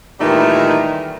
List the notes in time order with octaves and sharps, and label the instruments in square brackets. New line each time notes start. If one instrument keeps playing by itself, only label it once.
[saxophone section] A#2 D#3 E3 G3 A3 D#4